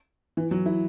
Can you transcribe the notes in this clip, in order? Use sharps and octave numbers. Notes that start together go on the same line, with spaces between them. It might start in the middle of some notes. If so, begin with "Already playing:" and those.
E3
F#3
E4